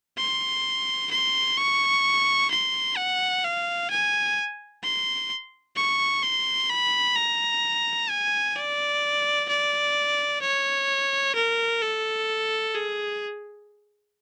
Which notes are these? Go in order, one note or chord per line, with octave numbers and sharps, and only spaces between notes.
C6
C6
C#6
C6
F#5
F5
G#5
C6
C#6
C6
B5
A#5
G#5
D5
D5
C#5
A#4
A4
G#4